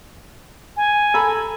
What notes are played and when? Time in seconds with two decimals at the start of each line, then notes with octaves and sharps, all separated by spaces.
0.77 G#5
1.14 A4 A#5 B5